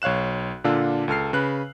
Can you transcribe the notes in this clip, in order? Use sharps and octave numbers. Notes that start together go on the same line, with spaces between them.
B1 C#5 F5 F#6 E7
A#2 D3 D4 F4 E6
C#2 A4 F6 C7
C#3 B4 F#6